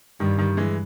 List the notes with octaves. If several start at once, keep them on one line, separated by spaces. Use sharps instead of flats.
G2 D#3 G3
D#3 G3
E3 G#3